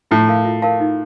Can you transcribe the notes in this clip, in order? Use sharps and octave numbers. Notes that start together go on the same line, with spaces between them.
A2 F4
A#4 F5 A5
F4
A#4 F5 A5
D#4